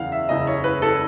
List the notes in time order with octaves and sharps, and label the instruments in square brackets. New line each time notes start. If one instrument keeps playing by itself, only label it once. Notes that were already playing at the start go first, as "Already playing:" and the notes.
Already playing: [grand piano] F#1 E2 C#3 E3 F5 F#5
E5
F#1 E2 C#3 E3 D#5
C#5
B4
A4